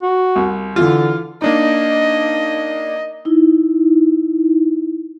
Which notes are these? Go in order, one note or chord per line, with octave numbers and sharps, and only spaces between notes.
F#4
C2
D3 E3 F4
A#3 D4 D#4 D#5
D#4 E4